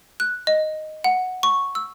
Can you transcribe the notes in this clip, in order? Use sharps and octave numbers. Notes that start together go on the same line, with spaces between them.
F#6
D#5
F#5
C#6
E6